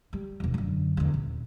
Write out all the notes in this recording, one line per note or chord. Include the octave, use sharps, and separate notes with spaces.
G3
E1 F2
F#2 D3
E2 D3
D#1